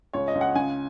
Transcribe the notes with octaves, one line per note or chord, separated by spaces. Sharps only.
C#2 C#5
D#5
C#2
F#5
C#3 G#5